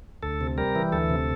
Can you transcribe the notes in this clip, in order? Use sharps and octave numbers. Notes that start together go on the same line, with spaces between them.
D2 A4
C3
G3 A#4
E3
D2 A4
C3